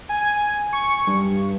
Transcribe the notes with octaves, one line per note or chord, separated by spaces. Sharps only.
G#5
C#6
G2